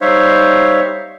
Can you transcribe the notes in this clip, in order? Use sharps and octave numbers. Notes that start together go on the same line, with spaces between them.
G3 D#4 C5 C#5 E5 F5